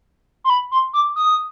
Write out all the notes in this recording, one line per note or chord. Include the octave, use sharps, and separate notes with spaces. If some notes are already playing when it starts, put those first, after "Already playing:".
C6
B5
C6
D6
D#6